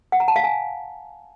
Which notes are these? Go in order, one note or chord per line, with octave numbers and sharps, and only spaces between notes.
F#5
A#5
A5
F5
G#5